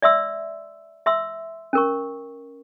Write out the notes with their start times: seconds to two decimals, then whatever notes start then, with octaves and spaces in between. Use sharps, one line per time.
0.02 D5 E5 C6 E6
1.06 E5 C6 E6
1.73 C#4 A#4 C#6